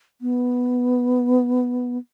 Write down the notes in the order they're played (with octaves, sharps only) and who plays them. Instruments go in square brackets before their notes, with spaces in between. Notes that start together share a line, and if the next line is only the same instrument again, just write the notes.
[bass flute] B3